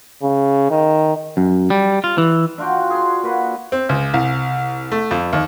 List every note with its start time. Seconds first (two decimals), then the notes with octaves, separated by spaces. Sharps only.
0.22 C#3
0.70 D#3
1.37 F#2
1.70 G3
2.04 F4
2.18 E3
2.58 D4 F4 F#4 G5
2.90 G#4 C6
3.23 A#3 F#4 B4
3.72 C4
3.89 C#2
4.14 C2
4.92 A3
5.11 F2
5.33 D#2